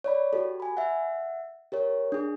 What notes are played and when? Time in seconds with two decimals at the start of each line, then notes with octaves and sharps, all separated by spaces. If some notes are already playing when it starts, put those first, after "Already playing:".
0.04 C#5 D5 B5
0.33 F#4 G4 A4
0.60 G#5 B5
0.77 E5 F#5
1.72 G4 A#4 C#5
2.12 D4 G#4